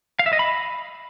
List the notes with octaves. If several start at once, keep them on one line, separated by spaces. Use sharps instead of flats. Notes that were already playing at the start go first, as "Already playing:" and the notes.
F5
E5
D#5
B5